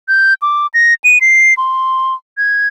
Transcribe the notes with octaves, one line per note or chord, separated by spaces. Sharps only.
G6
D6
A#6
D#7
C7
C6
G#6